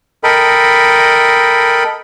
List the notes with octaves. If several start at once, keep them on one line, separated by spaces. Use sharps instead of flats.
A4 A#4 D#5 G5 B5